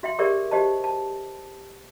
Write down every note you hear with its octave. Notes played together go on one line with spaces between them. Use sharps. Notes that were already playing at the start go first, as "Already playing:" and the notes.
F#4 E5 G5 C6
G4 G#4 A#4 C#5 D5 E5
F#4 G4 C5 D#5 A5
A5